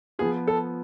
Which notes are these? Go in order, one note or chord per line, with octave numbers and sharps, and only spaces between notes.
F3 B3 F4 G#4
A4